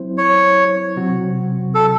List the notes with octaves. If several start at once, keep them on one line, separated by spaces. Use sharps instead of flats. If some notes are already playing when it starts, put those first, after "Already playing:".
Already playing: F#3 C4 E4 C5
C#5
C3 F#3 C4 F#4
A4